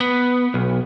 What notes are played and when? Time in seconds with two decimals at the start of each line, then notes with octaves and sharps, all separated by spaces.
0.01 B3
0.54 B1